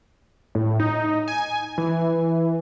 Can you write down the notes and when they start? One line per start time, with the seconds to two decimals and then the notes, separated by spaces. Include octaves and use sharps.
0.55 A2
0.80 D#4
1.28 G#5
1.78 E3